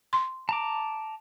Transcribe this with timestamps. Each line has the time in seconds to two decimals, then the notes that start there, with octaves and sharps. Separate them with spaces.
0.13 C6
0.49 A5 A#5 D6